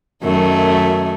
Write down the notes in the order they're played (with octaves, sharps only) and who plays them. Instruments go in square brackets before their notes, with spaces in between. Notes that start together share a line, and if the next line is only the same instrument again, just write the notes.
[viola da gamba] F#2 D#3 A3